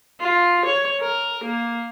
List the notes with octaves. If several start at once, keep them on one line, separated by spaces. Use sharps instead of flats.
F4
C#5
A#4
A#3